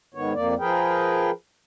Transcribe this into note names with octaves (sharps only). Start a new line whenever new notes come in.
G#2 D#3 B3 C#5
F2 A#3 D5
F3 G#4 A#4 B4 G5